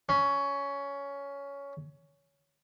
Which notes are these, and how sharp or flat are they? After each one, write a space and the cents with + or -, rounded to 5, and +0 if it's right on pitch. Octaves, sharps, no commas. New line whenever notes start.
C#4 +15